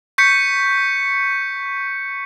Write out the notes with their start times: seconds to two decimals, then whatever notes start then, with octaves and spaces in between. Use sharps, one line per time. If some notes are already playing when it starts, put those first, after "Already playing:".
0.18 C#6 G6 B6 C#7